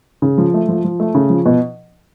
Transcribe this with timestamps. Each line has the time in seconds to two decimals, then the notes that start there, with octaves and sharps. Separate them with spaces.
0.22 C#3
0.38 F3
0.54 A3
0.69 F3
0.84 F3
1.00 A3
1.15 C#3
1.30 F3
1.46 B2